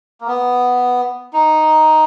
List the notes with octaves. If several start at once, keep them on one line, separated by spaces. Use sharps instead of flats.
A#3
B3
D#4